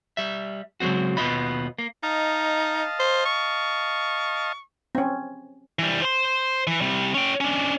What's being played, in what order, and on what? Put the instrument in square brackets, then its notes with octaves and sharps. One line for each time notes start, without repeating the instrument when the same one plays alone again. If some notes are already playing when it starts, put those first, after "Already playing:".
[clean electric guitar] G3 E5
C#3 F#3 G#3 C4 F#4
D#2 B2 B3 F4 D#5 B5
A#3
[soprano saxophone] D#4 [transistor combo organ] D#5 F5 A5
[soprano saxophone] C5
C#6
[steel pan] C4 C#4
[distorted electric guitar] E3 G3
C5 C6
E3
C3 G3
C#4 G5
C#4 D4